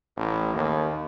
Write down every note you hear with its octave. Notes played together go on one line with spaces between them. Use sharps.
A1
D#2